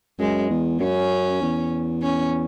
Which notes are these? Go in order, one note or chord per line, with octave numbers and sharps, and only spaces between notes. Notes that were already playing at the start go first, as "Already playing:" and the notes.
F#2 G#3
E2
F#2 C#4
E2
C#4